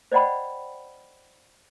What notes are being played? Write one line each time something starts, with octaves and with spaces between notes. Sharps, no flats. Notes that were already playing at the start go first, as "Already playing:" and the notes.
C5 D5 D#5 F#5 G5 B5